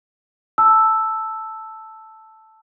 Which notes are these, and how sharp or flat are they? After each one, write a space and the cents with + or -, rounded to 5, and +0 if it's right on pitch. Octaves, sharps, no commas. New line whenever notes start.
A5 +0 E6 +0